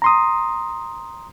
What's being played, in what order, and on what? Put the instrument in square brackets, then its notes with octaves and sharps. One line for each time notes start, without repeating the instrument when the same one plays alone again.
[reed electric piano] A#5 C6 D#6